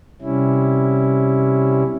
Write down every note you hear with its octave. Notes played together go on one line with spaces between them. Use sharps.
C3 G3 C#4 E4